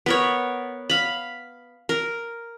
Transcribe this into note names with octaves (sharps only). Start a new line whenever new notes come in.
B3 A#4 C#5
F5 B5
A#4